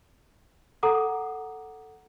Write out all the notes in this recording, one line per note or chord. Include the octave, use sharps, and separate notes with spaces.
A4 F#5 A#5 D6 D#6